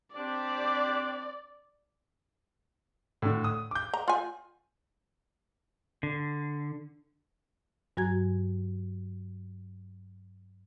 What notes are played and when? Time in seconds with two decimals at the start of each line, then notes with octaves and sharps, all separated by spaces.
0.16 C4 D4 G4 D5
3.22 A2 D3
3.44 D#6
3.71 D6 G6
3.94 A#5
4.08 F4 G#5
6.03 D3
7.97 G2 F#3 F#4 G#5 A#5 G#6